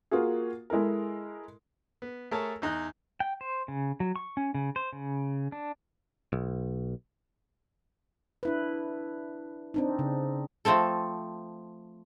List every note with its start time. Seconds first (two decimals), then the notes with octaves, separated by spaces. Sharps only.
0.11 A#3 F4 F#4 G#4
0.70 G#3 E4 A4 A#4
2.02 B3
2.31 A3 G#4 A#4 C#5 A5
2.62 E2 D#4 D#5 F#6
3.20 G5
3.41 C5
3.68 C#3
4.00 F#3
4.16 C#6
4.37 C#4
4.54 C#3
4.76 C5
4.93 C#3
5.52 D4
6.33 B1
8.43 D4 E4 B4
9.74 C4 D4 D#4
9.99 C#3
10.65 F3 A3 C4 A4